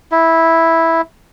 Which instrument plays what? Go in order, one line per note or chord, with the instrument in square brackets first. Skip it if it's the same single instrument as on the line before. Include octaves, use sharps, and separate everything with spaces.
[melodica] E4